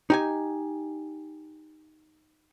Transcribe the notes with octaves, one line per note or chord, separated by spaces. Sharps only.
D#4 G4 G#5